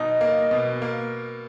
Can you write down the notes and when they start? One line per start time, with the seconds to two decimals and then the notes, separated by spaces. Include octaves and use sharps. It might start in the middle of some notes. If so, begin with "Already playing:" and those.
Already playing: B2 D#4 D#5
0.21 A#3
0.51 B2
0.82 A#3